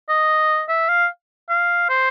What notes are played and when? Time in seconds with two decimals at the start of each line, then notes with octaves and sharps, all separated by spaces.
0.09 D#5
0.69 E5
0.89 F5
1.50 F5
1.89 C5